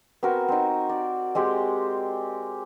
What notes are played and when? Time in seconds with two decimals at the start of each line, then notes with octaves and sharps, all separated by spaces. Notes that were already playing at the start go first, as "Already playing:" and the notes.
0.23 B3 C4 F#4 A#4
0.49 C4 D#4
0.89 D5
1.35 G#3 C4 G4